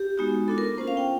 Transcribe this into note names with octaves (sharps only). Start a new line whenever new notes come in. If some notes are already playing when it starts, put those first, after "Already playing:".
Already playing: G4
G#3 B3 D#4 F#4
B3 D4 F4 A4
A#4
A#3 C#4 F4 C5
F5
G5